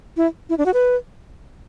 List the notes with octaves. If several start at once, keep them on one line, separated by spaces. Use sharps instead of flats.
E4
E4
D4
F#4
B4